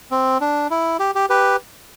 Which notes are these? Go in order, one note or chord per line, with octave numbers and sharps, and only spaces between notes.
C4
D4
E4
G4
G4
G4 B4